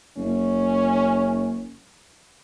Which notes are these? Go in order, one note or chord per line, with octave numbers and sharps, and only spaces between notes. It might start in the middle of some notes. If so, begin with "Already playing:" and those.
F#1 C#4